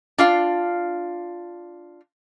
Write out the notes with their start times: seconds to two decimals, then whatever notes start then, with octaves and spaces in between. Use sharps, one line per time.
0.18 D4 F4 F5